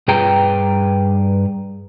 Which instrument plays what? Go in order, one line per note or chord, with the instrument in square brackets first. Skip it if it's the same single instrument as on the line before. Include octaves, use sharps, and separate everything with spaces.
[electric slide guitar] G2 G#4 B4 G5 A#5